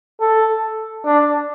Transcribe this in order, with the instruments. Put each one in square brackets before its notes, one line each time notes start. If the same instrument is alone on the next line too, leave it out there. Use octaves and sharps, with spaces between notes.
[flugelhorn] A4
D4